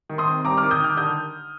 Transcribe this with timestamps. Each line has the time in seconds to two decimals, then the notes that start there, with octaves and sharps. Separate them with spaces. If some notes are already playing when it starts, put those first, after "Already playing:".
0.09 D#3
0.18 C6 D#6
0.28 C4
0.45 G3 A#5 D6
0.57 D#3 D6 F6
0.71 D#6 G6
0.80 D#3 D6 F6
0.97 D3 D#6 G6